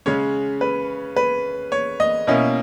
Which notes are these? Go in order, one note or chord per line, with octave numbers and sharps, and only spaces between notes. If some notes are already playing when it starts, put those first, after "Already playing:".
C#3 G#3 C#4 C#5
B4
B4
C#5
D#5
B2 A#3 C#4 E4 D#5